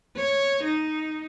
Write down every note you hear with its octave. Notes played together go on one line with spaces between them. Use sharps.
C#5
D#4